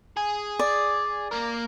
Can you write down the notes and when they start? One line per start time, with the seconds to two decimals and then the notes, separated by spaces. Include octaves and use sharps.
0.17 G#4
0.59 D5
1.32 A#3 A#4